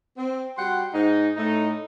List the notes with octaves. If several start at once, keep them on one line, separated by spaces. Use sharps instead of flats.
C4
G3 F#4 F#5 G5 C6
G#2 D#4
A2 A3 D#4